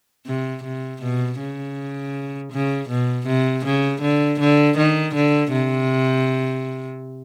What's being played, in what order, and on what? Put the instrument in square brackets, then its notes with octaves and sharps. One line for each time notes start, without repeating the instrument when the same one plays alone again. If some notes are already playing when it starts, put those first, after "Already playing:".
[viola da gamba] C3
C3
B2
C#3
C#3
B2
C3
C#3
D3
D3
D#3
D3
C3